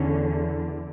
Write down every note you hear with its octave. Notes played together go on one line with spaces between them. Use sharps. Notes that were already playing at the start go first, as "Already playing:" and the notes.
Already playing: E2 D3 C#4